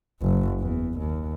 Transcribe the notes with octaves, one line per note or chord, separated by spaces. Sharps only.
F#1
E2
D#2